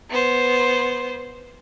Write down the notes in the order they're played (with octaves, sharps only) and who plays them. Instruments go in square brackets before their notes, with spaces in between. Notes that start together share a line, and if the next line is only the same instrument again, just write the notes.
[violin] B3 C5